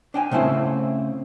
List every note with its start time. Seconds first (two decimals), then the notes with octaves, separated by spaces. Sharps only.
0.14 D4 G5 G#5
0.31 C#3 A3 C4 E4 C5